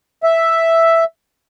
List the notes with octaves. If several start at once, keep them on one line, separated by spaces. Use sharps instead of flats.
E5